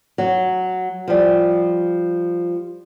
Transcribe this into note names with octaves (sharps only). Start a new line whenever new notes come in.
F#3
F3 G3